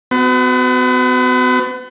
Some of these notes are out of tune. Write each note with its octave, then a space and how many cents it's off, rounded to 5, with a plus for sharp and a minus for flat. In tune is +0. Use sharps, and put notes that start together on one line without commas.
B3 +40 F#4 +0